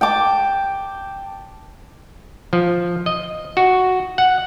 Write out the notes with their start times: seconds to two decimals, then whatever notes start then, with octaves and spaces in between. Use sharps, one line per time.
0.01 G5 A5 D6
2.53 F3
3.06 D#5
3.57 F#4
4.18 F#5